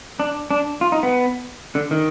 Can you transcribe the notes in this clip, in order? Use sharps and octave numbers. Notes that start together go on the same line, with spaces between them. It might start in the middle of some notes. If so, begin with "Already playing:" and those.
D4
D4
F4
D#4
B3
D3
D#3